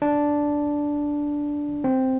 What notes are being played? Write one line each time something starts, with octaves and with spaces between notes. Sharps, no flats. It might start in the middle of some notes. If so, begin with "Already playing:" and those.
D4
C4